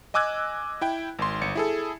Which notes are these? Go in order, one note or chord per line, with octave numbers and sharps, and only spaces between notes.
D#5 G#5 D6 E6 F#6 G#6
E4 G5
G#1 C6
G1 C#7
E4 G#4 A4